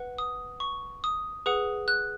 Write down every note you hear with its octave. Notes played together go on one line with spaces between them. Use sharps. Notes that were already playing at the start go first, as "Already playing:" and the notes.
Already playing: B4 F#5
D#6
C#6
D#6
G#4 B4 F#5 D#6
F#6